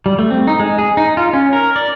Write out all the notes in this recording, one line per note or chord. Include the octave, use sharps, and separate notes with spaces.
G3
A3
C4
D#4
G#3
G#4
D#4
F4
C#4
A#4
D5